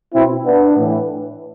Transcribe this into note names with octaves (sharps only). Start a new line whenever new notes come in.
B2 C4 E4
B3 D4
A2 E3